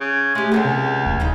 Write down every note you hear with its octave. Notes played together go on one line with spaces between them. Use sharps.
C#3
G#3 A3 G4
C#2 G#4 A4 C#5
C3
D1 D#2
D#3 G#3 D#4